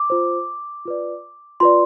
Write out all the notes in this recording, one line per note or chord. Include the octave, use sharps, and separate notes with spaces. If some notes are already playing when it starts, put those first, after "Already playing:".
Already playing: D6
F4 C5
F4 B4 D5
F4 B4 D5 C6